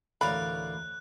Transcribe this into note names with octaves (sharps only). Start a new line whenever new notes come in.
A1 D2 A#4 C#5 D5 F5 B5 F#6